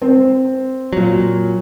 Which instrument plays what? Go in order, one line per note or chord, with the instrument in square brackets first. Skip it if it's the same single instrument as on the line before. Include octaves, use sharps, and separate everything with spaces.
[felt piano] C4
[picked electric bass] A#2 F#3